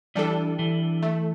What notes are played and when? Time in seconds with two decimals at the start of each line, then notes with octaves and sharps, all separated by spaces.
0.15 E3 G3 D4 A4
0.59 E3
1.03 A3